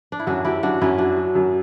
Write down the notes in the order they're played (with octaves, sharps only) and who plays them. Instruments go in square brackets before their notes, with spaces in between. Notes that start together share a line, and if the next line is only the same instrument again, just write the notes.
[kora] D4
E4
[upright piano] F#2 [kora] D4 F#4
[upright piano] F#2 [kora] E4 G4
[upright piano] F#2 [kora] D4 F#4
[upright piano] F#2 [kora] C#4 E4
[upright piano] F#3 [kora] D4 F#4
[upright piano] F#3
F#2